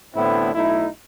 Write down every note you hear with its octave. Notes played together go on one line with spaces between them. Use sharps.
A1 A2 D3 B3 C4 E4
B1 A3 D#4 E4